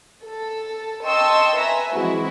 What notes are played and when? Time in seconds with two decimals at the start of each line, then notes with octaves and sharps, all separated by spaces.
0.25 A4
1.06 D#5 G5 A5 C6 C#6 E6
1.57 B4 E5 G#5 A#5
1.93 E3 F3 G#3 C4 E4 F#4